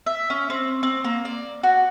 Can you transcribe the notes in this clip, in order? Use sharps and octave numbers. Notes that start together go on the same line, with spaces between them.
E5
C#4
C4
C4
A#3
D5
F#4